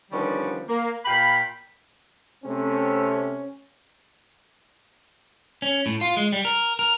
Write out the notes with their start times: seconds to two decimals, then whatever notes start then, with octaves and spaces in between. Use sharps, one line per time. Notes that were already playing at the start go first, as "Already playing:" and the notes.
0.12 D3 D#3 F3 G3 B3 C#4
0.68 A#3
1.05 A#2 F5 G5 B5
2.45 C3 A3 C4 C#4
5.62 C#4
5.86 A2
6.01 F4
6.17 G#3
6.33 G3
6.45 A#4
6.79 A#4